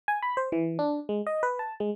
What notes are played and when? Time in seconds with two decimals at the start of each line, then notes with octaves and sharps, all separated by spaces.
0.08 G#5
0.22 B5
0.37 C5
0.52 E3
0.79 D4
1.09 G#3
1.27 D#5
1.43 B4
1.59 A5
1.80 G#3